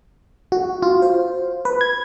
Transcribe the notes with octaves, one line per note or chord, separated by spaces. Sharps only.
F#4
F4
C5
B4
G#6